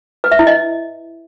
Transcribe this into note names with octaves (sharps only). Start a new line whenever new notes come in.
B4
E5
E4
D#5